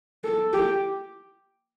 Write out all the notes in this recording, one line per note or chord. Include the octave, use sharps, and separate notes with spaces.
A4
G4